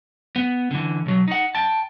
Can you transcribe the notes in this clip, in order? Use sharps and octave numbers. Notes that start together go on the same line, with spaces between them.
B3
D3 E3
B1 F#3
D#4 F#5
G5 A5